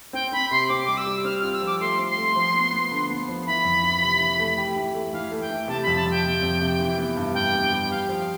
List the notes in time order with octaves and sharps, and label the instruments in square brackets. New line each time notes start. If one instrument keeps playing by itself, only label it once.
[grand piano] C4 [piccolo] G5
[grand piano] C4 [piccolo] B5
[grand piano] C3 [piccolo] C6
[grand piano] C4 [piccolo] D6
[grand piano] G3 [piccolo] D6
[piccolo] E6
[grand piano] G3
[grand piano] C4 [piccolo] F6
[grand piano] F4 [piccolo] F6
[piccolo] E6
[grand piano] F3 [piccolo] D6
[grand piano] A3 [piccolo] C6
[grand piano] C4
[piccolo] C6
[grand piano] A3
F3
B3
B3
D3
B3
F3
[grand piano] E3 [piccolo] B5
[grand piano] F2
E3
C3
E3
A3
G4
E3
A3
[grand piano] E3 [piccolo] F5
[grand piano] A3
[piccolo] G5
[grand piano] E3
[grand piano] C3 [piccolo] A5
[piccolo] B5
[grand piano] F2
[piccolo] A5
[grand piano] F2 [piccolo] G5
[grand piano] C3
F2
C3
E3
B3
G2
[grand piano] G2 [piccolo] G5
[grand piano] B3
G3
[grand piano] G4 [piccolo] F5
[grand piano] F3
[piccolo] F5